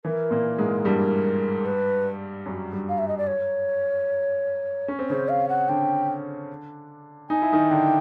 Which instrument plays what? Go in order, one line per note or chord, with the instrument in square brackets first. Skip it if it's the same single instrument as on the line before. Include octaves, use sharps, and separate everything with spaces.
[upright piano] E3 E4 [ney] A#4
[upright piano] A#2 A#3
G#2 G#3
G2 G3
[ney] B4
[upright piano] F#2 F#3
G2 G3
[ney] F5
E5
D#5
D5
C#5
[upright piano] C#4
C4
[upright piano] C#3 C#4 [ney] C5
[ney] F5
F#5
[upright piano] D3 D4 [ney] G5
[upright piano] D#4 [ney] G#5
[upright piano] E4
D#3 D#4
[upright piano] D3 D4 [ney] G5